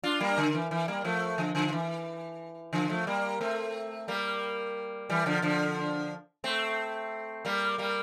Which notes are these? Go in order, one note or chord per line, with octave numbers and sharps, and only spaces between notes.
D4 F4
G3 A#3
D3
E3
E3
G3 A#3
F3 A3
D3 F3
D3 F3
E3
D3 F3
F3 A3
G3 A#3
A3 C4
G3 A#3
E3 G3
D3 F3
D3 F3
A3 C4
G3 A#3
G3 A#3